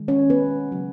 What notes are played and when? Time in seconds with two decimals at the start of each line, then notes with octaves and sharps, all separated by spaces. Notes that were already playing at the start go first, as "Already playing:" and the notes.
Already playing: D#3 G#3
0.08 C#4 C#5
0.30 B3 B4
0.72 C#3 F#3 A#3